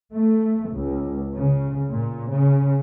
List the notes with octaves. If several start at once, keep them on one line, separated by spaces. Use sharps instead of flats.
A3
C#2
C#3
A#2
C#3